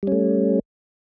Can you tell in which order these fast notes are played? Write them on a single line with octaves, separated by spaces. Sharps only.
G3 C#4 A3